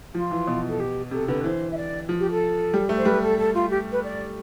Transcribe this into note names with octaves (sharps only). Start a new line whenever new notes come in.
F3 F4
E3
B2
A4
G4
C3 A4
D3 B4
E3 C5
E5
D5
F3
G4
A4
G3
A3
C5
G3 B4
A4
A4
F4
G4
B4
D5